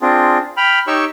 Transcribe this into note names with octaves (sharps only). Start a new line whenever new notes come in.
C4 D4 F4 G#4
G5 B5 F6
D#4 G4 C#5 G5 C#6 E6